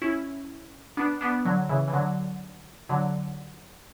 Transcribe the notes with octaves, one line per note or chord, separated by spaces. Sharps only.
C#4 E4
B3 D4
B3 D4
D3 F#3
C#3 E3
E3
D3 F#3
D3 F#3